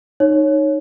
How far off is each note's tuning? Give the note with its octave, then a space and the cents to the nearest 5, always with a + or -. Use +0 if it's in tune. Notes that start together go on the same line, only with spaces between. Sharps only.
D#4 -15 C#5 -5